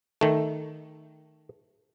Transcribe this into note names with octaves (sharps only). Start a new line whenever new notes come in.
D#3 A3